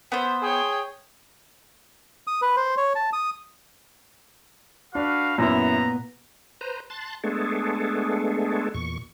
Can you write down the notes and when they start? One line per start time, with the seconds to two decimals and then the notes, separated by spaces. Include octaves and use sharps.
0.12 B3 C5 E5
0.42 G#4 C#5 G5
2.27 D#6
2.42 B4
2.57 C5
2.77 C#5
2.95 A5
3.13 D#6
4.95 D4 F#4 B4 F5
5.38 F#2 A#2 B3 E4 B4 A#5
6.61 B4 C5 A#5
6.90 A5 C6 F#6 A6
7.24 G#3 A3 B3 D4 G#4 A4
8.74 E2 A#2 C#6